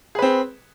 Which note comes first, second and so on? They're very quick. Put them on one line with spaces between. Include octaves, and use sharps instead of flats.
G#4 B4 C4